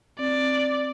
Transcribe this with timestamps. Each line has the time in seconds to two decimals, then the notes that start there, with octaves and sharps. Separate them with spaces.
0.19 C4 D5